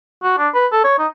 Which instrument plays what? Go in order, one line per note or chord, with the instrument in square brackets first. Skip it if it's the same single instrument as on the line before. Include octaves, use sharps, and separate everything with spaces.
[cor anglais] F#4
D4
B4
A4
C#5
D#4